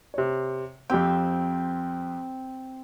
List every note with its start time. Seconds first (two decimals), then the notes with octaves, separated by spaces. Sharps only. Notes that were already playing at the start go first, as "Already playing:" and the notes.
0.14 C3 C#5
0.90 F2 C4 G4 G5